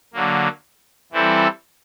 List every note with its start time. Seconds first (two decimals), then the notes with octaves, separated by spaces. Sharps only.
0.13 D3 F#3 A#3
1.12 E3 G3 C4 E4 A4